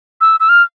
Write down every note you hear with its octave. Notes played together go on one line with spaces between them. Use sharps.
E6
E6
F6